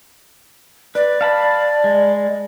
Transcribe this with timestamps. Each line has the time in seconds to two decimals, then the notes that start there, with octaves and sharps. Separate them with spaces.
0.95 B4 D5
1.21 F5 A5 B5
1.84 G#3